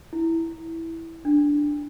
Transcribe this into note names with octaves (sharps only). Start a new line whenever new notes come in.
E4
D4